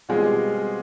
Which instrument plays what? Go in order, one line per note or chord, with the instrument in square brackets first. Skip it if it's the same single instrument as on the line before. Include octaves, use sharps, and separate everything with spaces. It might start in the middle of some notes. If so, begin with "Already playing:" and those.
[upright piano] B2 G3 C4 F4 G#4 [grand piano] G#3